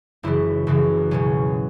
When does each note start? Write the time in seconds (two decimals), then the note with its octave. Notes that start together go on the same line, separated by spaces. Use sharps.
0.23 F#1 F#2 C#3 E3 E4
0.67 F#1 F#2 C#3 E3
1.11 C#2 B2 F#3 C#4